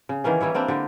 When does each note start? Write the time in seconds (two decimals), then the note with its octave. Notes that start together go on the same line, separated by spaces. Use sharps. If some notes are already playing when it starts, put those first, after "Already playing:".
0.09 C#3
0.24 D#3 E3 A#3 C#4
0.40 E3 G3 E4 C#5
0.54 G3 A#3 C4 D4
0.68 D3 G4